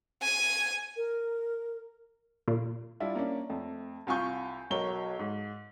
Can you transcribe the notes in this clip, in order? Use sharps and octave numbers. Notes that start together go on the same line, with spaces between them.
G#5
A#4
A#2
G3 D4 E4 F4
A#3 C#4 D4
F2 A3
C2 F4 G#5 C#6 G6
B1 F#3 A#4 C#5 G7
G#2